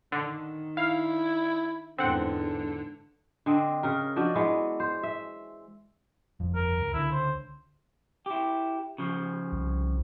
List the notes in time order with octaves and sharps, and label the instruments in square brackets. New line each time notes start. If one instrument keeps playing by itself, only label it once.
[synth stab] D3 [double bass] D#3
[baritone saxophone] E4 [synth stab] F5
[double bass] E2 G#2 [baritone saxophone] D3 [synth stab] C4 F#5
[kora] D3 C4 D4 D#5
C#3 A#4
F3 D4 F#4 D#5
E3 G#3 B3
C5
E5
[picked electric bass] G1 F2
[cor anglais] A#4
[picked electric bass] C#2
[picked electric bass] C#2 D3 [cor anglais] E4
[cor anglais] C5
[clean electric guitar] E4 G4
C#3 F3
[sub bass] C2